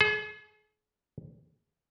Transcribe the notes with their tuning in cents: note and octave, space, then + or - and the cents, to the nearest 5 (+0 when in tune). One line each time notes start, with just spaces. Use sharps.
G#4 +40